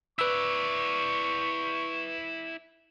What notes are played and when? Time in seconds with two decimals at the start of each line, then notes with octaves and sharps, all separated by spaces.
0.19 E4 B4 D5 C#6 E6